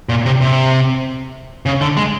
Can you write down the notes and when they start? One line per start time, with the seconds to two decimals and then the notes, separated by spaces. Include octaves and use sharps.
0.09 A#2
0.26 C3
0.41 C3
1.66 C#3
1.81 D3
1.97 G#3